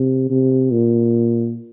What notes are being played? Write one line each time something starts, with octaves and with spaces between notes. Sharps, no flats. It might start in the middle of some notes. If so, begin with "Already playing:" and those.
Already playing: C3
C3
A#2